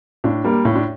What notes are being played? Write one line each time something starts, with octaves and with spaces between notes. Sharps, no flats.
A2 D4
G3 A#3
A2 C#4
D4